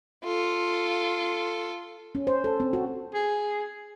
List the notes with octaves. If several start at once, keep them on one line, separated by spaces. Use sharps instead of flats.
F4 A4
C#4
C5
A4
C4
F#4
G#4